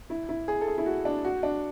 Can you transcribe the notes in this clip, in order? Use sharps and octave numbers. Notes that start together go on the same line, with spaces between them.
E4
E4
G#4
A4
G#4
E4
F#4
D4
F#4
D4